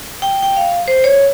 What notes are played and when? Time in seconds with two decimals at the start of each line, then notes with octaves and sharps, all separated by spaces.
0.22 G5
0.43 G5
0.57 F5
0.88 C5
1.04 C#5